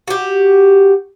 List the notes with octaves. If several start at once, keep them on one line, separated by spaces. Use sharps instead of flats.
F#4 G4